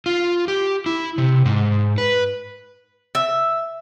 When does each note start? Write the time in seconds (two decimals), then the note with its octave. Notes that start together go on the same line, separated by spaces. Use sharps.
0.06 F4
0.48 G4
0.86 E4
1.18 C3
1.45 G#2
1.98 B4
3.15 E5